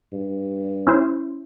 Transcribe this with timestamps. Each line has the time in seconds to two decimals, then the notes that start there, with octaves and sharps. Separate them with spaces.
0.12 G2
0.87 C#4 E4 C5